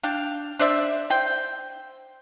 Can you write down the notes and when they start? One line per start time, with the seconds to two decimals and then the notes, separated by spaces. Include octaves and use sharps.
0.03 D4 F5 G5
0.59 D4 C5 D5 E5
1.10 C5 G5